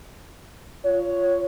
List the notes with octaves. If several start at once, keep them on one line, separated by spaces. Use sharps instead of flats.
F4 C#5